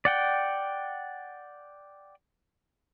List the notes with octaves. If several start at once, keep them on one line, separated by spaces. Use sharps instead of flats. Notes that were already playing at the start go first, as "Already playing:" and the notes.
D5 F#5 G5